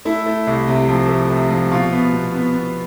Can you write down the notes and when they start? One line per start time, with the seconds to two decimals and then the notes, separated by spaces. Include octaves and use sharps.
0.05 A3 E4
0.26 A3
0.47 C2
0.68 C3
0.89 F3
1.09 A3
1.30 C3
1.51 F3
1.72 B2 F4
1.92 B3
2.13 B2
2.34 B3
2.54 B3